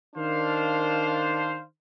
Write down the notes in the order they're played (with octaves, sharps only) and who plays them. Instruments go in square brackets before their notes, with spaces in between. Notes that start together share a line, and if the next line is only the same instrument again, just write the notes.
[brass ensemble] D#3 D4 C5 F5